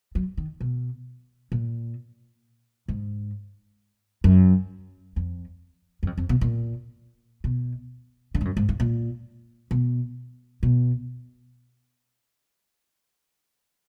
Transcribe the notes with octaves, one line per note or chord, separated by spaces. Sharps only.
F#3
D#3
B2
A#2
G#2
F#2
F2
F#2
F2
F2
B2
A#2
B2
D3
G#2
F#2
G#2
G#2
A#2
B2
B2